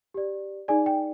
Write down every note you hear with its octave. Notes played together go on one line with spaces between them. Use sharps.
G4 D5
D#4 G#4 D5 G#5
G5